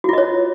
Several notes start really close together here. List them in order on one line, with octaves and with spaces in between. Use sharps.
F#4 F4 D#5 C#5